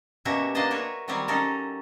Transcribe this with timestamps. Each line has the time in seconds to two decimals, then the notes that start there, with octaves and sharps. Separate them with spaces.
0.25 B2 A#3 C#4 F#4 G4 E5
0.55 A#3 B3 D4 C5 D#5 A5
0.71 F#4 A#4 B4 C#5 E5
1.08 D#3 F#3 G3 C4 G4 C#5
1.28 C#4 D#4 A4 A#4